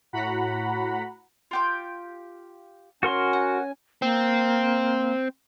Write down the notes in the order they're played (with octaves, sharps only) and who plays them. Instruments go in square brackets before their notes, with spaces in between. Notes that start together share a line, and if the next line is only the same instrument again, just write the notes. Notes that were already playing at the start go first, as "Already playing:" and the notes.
[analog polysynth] A2 F#4 F#5 A#5 B5
[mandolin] F4 G4 G5
[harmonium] C#4 G#5 [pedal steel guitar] F#4 A#4 C6
[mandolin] F#5
[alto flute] A#3 [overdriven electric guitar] C4